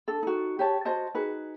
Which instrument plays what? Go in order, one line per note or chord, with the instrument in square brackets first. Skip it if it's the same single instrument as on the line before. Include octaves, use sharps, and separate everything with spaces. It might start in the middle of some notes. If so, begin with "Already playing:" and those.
[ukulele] D4 A4
D#4 F#4
G4 C#5 A5
F#4 C5 D#5 A5
D#4 F#4 G#4 B4